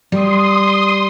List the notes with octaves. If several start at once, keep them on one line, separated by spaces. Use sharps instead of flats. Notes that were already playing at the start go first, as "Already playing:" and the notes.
G3 C6 D#6